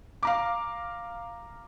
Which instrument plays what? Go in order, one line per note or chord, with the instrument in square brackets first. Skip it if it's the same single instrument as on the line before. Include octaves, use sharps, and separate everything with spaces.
[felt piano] F5 A#5 D6